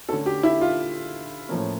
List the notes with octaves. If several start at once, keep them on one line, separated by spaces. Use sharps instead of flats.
D3 A3 C#4 A4
G4
E4
F4
A2 F3 A#3 C#4